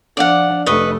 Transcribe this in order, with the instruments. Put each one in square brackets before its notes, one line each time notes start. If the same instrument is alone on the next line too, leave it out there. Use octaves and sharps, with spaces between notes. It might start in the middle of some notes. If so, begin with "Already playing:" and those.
[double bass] F3 D4 [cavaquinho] D5 F5 F#5
[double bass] F1 A3 [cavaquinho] B4 D#5 C#6